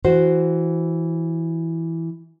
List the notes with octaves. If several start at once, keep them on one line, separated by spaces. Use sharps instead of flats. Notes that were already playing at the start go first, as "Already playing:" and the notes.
E3 F#4 C5